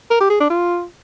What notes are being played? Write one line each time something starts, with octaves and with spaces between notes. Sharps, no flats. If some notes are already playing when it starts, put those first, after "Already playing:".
A#4
G4
G#4
D4
F4